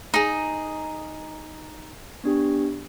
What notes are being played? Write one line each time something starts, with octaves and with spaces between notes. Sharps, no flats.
D#4 G#4 A#5
B3 D4 G4